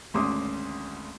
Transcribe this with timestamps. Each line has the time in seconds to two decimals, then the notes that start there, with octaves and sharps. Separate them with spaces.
0.14 G#1 D2 C#4 C6 D6 D#6